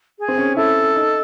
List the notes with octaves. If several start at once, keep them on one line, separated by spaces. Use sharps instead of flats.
G#4
C4
C#4
E4 A4
D#4